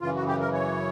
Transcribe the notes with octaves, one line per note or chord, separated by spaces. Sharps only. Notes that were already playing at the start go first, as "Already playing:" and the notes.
F#2 C#3 E3 F4
F#4
G4
A#4
C#5